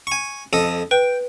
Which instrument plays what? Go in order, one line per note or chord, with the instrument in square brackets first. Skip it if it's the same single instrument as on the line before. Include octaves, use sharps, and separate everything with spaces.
[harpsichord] G#5 C#6
F2 A4 D#5
[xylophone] B4 [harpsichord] G5